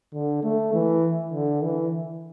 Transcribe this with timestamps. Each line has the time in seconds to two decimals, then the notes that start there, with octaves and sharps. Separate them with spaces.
0.14 D3
0.44 A3
0.74 E3
1.33 D3
1.63 E3